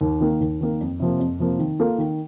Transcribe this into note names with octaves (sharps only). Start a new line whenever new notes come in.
D#2
D#3 A#3
D#2
D#3 A#3
F2
C3 F3 A#3
F2
C3 F3 A#3
D#3
A#3 F4 A4
D#3